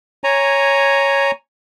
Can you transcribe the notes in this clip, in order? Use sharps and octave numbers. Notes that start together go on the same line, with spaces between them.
C#5 G#5 A#5